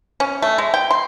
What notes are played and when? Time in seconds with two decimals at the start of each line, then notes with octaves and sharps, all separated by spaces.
0.20 C#4
0.42 A3
0.58 G#3
0.74 G5
0.91 C6